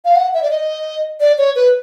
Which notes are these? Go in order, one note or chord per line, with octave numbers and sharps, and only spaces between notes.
F5
F#5
E5
D5
D#5
D5
C#5
B4